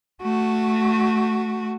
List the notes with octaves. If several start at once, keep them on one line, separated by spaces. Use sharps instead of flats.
A3 F#4